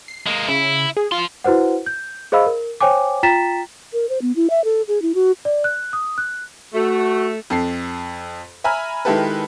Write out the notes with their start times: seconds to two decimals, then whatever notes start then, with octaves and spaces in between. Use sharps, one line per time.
0.08 C7
0.26 G#3 A#3
0.48 C#3 E4
0.97 G#4
1.12 F3 F4 C6
1.44 E4 F#4 B4 C5 F#5
1.86 G6
2.32 G#4 C5 D#5 F5 B5 E6
2.46 A#4
2.81 C5 C#5 G5 G#5 D6
3.23 F4 G5 A#5 A6 B6 E7
3.93 A#4
4.09 C5
4.22 B3
4.36 E4
4.50 E5
4.65 A4
4.88 G#4
5.02 E4
5.15 F#4
5.45 D5
5.64 F#6
5.93 D#6
6.18 F#6
6.74 A3 F#4
7.50 F2 A4 C7
8.64 E5 G#5 A#5 B5 F6
9.05 D#3 G#3 E4 G4 A4 B4